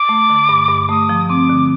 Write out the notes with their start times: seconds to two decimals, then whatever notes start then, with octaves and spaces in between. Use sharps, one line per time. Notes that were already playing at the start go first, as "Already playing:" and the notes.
Already playing: D6
0.09 A3
0.29 D3
0.49 G2
0.69 G2
0.89 A3 D#6
1.09 F3
1.29 C4 D6
1.49 D3